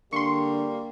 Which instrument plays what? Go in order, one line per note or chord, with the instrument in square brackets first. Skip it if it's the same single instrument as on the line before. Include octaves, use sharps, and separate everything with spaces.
[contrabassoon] D3 [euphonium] G3 [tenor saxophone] A#3 [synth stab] C6 C#6